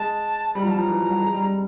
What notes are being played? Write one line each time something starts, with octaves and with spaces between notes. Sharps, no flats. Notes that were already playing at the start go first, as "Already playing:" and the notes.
Already playing: G#3 A5
G3 B5
F3 A#5
F#3
A5
F3 A#5
E3
F3
F#3
G3
G#3
G3
G3